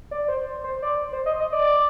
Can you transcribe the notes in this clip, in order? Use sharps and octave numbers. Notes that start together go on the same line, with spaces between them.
D5
C5
C5
D5
C5
D#5
D#5
D5